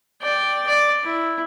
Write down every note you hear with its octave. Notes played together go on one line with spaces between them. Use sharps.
D5 G5
D5
E4